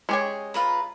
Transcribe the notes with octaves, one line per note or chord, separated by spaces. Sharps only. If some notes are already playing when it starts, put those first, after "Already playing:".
G#3 C#4 G4 C#5
F4 B4 A#5